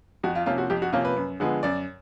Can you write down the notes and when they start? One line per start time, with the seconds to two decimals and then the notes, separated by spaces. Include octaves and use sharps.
0.23 F2 F#4
0.35 F4
0.46 C3 F3 A#3 C#4 F4
0.58 F#4
0.70 F2 G4
0.82 F#4
0.93 C3 F3 A#3 C#4 F4
1.05 B4
1.16 F#2
1.40 D3 F3 G#3 B3
1.63 F#2 D5